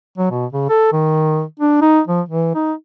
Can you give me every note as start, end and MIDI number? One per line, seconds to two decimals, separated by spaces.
0.18 0.30 54
0.31 0.46 47
0.52 0.65 49
0.69 0.90 69
0.92 1.43 51
1.60 1.80 62
1.82 2.00 63
2.08 2.21 53
2.29 2.52 52
2.55 2.73 63